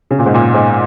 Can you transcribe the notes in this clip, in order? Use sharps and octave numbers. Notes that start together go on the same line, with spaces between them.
C#3
A#2
G#2
A#2
G#2